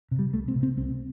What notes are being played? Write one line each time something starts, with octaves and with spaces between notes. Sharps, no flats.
C3
G3
C2 A3
C4
C3
C4
C2 C4